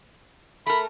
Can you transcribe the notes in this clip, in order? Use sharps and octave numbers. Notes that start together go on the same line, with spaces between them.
A3 A#4 B5